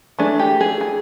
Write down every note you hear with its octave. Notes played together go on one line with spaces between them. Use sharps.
E3 A3 D4 G#4
G4
G#4
G#4